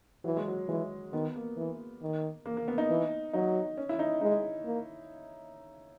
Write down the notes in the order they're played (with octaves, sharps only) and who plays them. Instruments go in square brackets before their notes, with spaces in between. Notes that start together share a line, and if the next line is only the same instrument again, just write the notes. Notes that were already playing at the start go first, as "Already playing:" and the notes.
[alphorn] E3 [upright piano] F#3
[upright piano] G#3
F#3
[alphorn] E3 [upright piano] G#3
[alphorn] D#3 [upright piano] B3
[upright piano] A#3
[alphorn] E3
D#3
[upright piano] A#3
A#3
B3
D#4
[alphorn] E3
[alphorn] F#3 [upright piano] D#4
[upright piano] C#4
E4
D#4
[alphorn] G#3 [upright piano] D#4
[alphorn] A#3